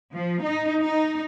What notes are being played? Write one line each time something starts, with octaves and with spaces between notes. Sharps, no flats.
F3
D#4
D#4